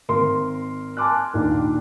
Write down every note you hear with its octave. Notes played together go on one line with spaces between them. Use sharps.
G#1 A#4 C6
G#5 A5 C6 D6 F6 F#6
D#2 A#2 D#3 D4